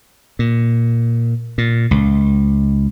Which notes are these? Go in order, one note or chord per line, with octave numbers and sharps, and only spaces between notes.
A#2
A#2
C#2